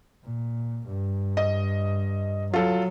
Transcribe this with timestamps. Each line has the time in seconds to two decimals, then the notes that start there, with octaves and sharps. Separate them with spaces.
0.23 A#2
0.88 G2
1.37 D#5
2.54 F#3 F4 A4